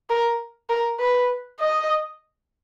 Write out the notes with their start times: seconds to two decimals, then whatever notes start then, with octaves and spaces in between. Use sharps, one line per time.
0.10 A#4
0.69 A#4
1.00 B4
1.60 D#5